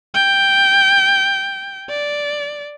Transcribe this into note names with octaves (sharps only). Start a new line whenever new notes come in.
G5
D5